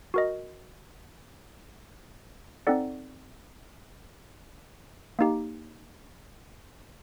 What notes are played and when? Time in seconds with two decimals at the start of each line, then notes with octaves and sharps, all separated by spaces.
0.14 F#4 A#4 D#5
2.67 C4 D#4 A4 D5 F#5
5.19 A#3 D#4 G4